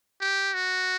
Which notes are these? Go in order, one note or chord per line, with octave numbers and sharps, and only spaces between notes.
G4
F#4